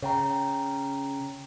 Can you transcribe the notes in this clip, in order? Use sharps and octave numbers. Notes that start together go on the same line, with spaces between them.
C#3 C#5 G5 A#5